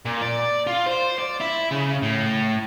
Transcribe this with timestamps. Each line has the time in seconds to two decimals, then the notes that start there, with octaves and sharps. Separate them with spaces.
0.05 A#2
0.22 D5
0.67 F4
0.86 C5
1.18 D5
1.40 E4
1.71 C#3
2.03 A2